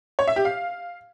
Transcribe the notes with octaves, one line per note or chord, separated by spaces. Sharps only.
C#5
E5
G4
F5